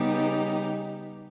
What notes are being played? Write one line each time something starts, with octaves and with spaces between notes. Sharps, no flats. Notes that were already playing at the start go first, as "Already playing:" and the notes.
Already playing: C#3 G3 B3 D#4 G4